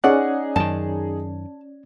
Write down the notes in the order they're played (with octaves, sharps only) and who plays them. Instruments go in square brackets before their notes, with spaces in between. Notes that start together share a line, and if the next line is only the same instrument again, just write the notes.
[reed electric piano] C#4 D5 F#6 [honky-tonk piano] D#4 G#4 [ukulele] F#5
[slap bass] F#2 D#3 [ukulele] A5